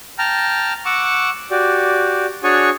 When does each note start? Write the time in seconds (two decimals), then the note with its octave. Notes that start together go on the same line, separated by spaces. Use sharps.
0.19 G5 A5 A#5 F6
0.85 F#5 C#6 D6 E6
1.51 F#4 G4 D5
2.44 D4 F#4 G#4 C#5 G#5 C#6